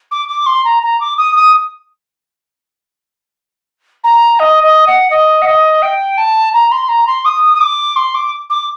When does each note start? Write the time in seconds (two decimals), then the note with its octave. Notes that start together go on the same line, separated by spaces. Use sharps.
0.11 D6
0.28 D6
0.46 C6
0.64 A#5
0.82 A#5
1.00 D6
1.17 D#6
1.35 D#6
4.04 A#5
4.39 D#5
4.63 D#5
4.87 F#5
5.10 D#5
5.42 F#5
5.46 D#5
5.82 G5
6.17 A5
6.53 A#5
6.71 C6
6.88 A#5
7.07 C6
7.25 D#6
7.54 D#6
7.60 D6
7.96 C6
8.14 D6
8.50 D6